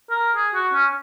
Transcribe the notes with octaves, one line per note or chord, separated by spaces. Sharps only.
A#4
G#4
F#4
C#4